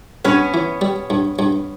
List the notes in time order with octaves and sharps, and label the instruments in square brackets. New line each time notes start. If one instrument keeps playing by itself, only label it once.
[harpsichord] G2 [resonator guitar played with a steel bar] B3 C#4
[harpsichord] E3
G3
G2
G2